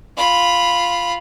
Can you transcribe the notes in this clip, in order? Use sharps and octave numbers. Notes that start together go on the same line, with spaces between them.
F4 B5